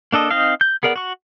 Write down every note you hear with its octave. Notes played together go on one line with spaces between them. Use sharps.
A#3 D4 A4 D#5
C4 D#4 D#5 F5
G6
B3 G#4 A#4 D5 F#5
F#4 C#6